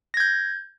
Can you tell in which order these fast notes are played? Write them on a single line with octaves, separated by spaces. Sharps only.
A#6 G#6 G6